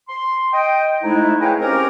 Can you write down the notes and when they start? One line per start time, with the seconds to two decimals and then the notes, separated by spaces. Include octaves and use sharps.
0.09 C6
0.53 D#5 G5
1.02 F2 G#3 A3 D#4 E4
1.41 G#4 B4 C#5 D#5 F5 G5
1.60 C4 C#4 G4 A#4